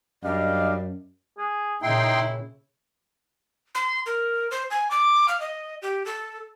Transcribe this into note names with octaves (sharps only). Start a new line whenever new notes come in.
F#2 G3 D4 D#5 F5
G#4
A#2 C#3 D#4 E4 G5 C6
C6
A#4
C5
G#5
D6
F5
D#5
G4
A4